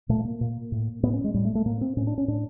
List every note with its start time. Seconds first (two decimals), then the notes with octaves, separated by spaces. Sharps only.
0.09 A#2 A3
0.25 A#3
0.41 A#2
0.72 A2
1.03 A2 B3
1.13 C#4
1.24 G#3
1.34 A2 G3
1.45 A3
1.55 A3
1.65 A2 A#3
1.81 C4
1.97 A2 C#4
2.07 D4
2.18 C#4
2.28 A2 D4